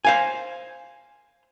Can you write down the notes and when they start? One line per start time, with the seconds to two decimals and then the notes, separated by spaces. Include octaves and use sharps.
0.05 C5 F5 G#5